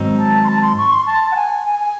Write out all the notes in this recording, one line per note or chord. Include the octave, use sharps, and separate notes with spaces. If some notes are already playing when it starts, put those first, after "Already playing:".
Already playing: G#2 D#3 F#3 C4 D#4
A5
C6
A5
C6
C#6
C6
A5
F#5
G#5
G#5
G#5